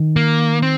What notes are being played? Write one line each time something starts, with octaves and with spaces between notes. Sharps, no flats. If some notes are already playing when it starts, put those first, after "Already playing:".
Already playing: D#3
A#3
C4